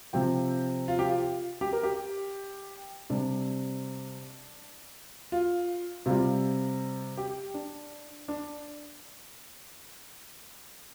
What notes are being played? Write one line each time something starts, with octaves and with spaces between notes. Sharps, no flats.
C3 F3 G5
F4
G4
F4
G4
A#4
G4
C3 G3 D4
F4
C3 G3 F4
G4
D4
D4